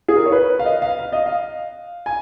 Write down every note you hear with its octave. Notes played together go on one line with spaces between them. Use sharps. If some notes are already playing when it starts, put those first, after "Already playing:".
G#4
A#4
C#5
B4
F5
D#5
F5
F5
D#5
F5
G#5